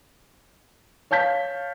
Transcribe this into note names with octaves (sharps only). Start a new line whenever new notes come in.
C#5 F5 A5 G6 B6